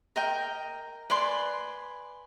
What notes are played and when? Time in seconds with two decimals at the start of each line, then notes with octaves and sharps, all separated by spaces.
0.16 A#4 D#5 G5
1.10 B4 D5 G#5 C6